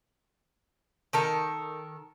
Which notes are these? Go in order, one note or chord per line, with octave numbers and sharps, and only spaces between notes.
D#3 A4 A#4